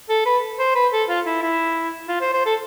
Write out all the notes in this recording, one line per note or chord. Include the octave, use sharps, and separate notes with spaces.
A4
B4
C5
B4
A4
F4
E4
E4
F4
C5
C5
A4